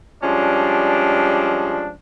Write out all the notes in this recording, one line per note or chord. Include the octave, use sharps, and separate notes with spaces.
F3 G3 G#3 C#4 D4